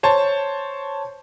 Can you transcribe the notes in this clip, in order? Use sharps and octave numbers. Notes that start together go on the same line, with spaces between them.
C5 C#5 A5